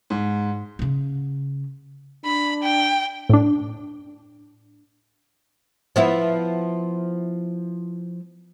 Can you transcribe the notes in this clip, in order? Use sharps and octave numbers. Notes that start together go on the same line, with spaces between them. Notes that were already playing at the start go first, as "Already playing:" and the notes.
G#2
C#3 C#4
D4 B5
G5
A2 D4
F3 B3 E4